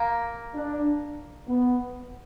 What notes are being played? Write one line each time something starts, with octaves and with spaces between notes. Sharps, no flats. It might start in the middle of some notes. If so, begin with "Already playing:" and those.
Already playing: A#3
D4
B3